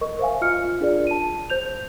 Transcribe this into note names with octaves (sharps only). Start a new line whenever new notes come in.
A#4 D#5 C#6
C5 E5 F5 G#5
F4 D#5 F6 C#7
D4 F4 G#4 A#4 D5
A5 D#7
C5 G6 F7